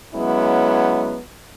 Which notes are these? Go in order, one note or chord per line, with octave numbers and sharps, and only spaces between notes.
F#3 G#3 B3 C#4 E4